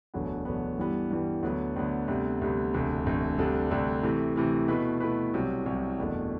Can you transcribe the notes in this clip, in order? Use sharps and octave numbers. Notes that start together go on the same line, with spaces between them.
E1 D2 D3 F#3 B3
E1 D2 D3 F#3 B3
G2 E3 G3 B3
G2 E3 G3 B3
D2 D3 F#3 B3
D2 D3 F#3 B3
D2 C3 G3 B3
D2 C3 G3 B3
E1 D2 C3
E1 D2 C3
D2 C3 G3 D4 A4
D2 C3 G3 D4 A4
C3 E3 A3
C3 E3 A3
B2 A3 E4 B4
B2 A3 E4 B4
C2 C3 F#3
C2 C3 F#3
F#1 E2 B2 A3 D4